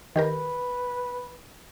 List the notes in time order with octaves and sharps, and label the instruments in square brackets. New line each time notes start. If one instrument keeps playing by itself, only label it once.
[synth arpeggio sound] D#3 G4 A#4 [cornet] B4